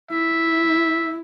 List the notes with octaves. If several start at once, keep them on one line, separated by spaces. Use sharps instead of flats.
E4 E5